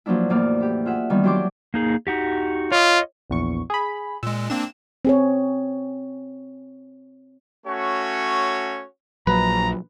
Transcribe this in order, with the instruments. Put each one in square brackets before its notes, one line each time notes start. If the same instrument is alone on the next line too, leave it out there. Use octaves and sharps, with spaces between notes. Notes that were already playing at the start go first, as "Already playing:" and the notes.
[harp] F3 F#3 A#3 D4 E4
E2 A2 A#3 D5 D6 F6
E4 G4
F4 G#4 E5 F#5
D#3 E3 G3 B3 E4
F#3 D4 G4 C6 D6
[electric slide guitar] A#3 D#4 G#4
D#4 F#4 G4
[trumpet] F4 [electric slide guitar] C#5 D#5
[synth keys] A#1 E2 C#6
G#4 B5
[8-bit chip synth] A#2 G#3 [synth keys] E6
[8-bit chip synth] A#3 C4 D4 [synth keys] E7
[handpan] C4 G#4 C#5
[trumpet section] A3 C#4 F#4 C#5
[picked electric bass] A#1 [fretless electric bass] F#3 [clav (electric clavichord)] B4 [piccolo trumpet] A#5